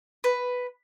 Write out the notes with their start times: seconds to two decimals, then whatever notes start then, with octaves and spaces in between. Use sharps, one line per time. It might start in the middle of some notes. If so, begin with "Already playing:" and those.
0.24 B4